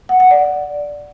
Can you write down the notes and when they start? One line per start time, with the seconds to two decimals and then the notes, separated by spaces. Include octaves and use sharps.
0.09 F#5
0.20 F#5
0.31 D5